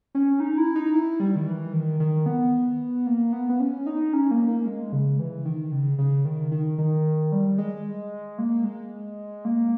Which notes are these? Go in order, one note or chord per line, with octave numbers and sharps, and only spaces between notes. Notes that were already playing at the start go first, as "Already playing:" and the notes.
C#4
D#4
E4
D#4
E4
G3
D#3
E3
D#3
D#3
B3
A#3
B3
B3
C#4
D#4
C#4
A#3
A#3
G#3
C#3
E3
D#3
C#3
C#3
D#3
D#3
D#3
G3
G#3
A#3
G#3
A#3